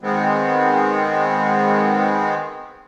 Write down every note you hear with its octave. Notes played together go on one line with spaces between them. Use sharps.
D#3 G#3 B3 C4